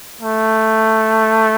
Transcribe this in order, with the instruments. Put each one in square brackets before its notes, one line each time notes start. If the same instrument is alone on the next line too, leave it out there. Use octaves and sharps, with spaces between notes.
[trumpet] A3